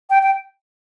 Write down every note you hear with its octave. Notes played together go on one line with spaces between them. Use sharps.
G5
G5